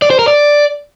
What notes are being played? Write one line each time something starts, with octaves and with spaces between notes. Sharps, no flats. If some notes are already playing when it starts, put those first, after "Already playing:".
D5
C5
A#4
D5